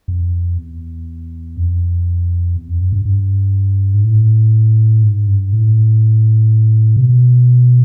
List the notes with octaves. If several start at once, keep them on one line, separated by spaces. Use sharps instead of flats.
F2
E2
F2
E2
F2
F#2
G2
G2
G#2
A2
G#2
G2
A2
C3
B2